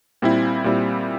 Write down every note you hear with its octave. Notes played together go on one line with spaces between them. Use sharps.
A#2 G3 C4 E4
A#2 G3 C4 E4